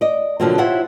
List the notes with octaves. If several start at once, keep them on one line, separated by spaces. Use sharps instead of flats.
D5 D#5
B2 D3 F3 F#3 A#3 C4
E4 F4 G4 C5 C#5 F#5